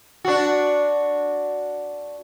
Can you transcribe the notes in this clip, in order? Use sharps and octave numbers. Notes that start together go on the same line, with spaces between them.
D4 F#4